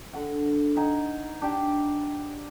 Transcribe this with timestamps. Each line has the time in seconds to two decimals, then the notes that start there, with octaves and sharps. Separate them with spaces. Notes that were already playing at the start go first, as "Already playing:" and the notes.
0.13 D3 F#5
0.77 D#4 F#5 G#5
1.42 D4 G4